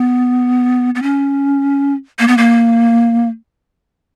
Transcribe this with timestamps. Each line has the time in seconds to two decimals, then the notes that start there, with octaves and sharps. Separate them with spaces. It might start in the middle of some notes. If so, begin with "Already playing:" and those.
Already playing: B3
0.95 B3
1.02 C#4
2.19 A#3
2.28 B3
2.38 A#3